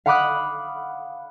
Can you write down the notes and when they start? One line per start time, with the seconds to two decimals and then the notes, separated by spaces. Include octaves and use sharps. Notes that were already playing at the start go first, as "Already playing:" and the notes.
0.06 F5 F#5 B5 D6 D#6 F#6